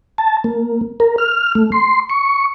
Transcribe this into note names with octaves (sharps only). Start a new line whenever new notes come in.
A5
A#3
A#4
F6
A3
C6
C#6